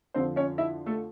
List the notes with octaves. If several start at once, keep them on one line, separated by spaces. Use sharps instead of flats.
F2 D3 F3 C4 C5
C#4 C#5
E4 E5
A3 A4